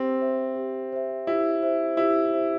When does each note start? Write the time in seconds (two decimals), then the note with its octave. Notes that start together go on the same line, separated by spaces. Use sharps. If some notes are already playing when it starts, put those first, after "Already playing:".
Already playing: C4 G4
0.21 C5 E5
0.56 G4
0.92 C5 E5
1.27 E4 G4
1.62 C5 E5
1.97 E4 G4
2.33 C5 E5